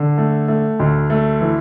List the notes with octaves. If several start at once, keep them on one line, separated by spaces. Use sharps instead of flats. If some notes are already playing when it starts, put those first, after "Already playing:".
Already playing: D3
A3
A3
D2
A3
E3